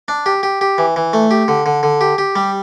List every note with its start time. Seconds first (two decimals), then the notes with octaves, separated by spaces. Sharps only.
0.08 D4
0.26 G4
0.43 G4
0.61 G4
0.78 E3
0.96 E3
1.13 A3
1.31 G4
1.48 D3
1.66 D3
1.83 D3
2.01 G4
2.18 G4
2.36 G3